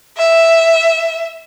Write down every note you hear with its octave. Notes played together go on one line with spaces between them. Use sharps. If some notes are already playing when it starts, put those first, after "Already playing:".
E5